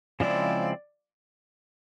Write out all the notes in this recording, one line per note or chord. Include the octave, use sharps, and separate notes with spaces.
C#3 F3 G#3 C4 E4 D5